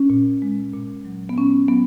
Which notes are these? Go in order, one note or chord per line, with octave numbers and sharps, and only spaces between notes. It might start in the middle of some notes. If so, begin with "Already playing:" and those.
Already playing: C#4
A#2
G#3
A#2
F#3
B3
A#2 C#4
F#3 B3